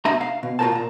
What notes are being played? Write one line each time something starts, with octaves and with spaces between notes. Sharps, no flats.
B2 D4 D#5 E5 A#5
F5
B2
A#2 F4 F#4 A#4 C5 A5
A#2 A#5